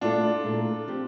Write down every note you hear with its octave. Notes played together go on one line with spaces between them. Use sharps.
A#2 A3 D4 E4 F4 A4
A#2 A3 E4 A4
F3 C4 G4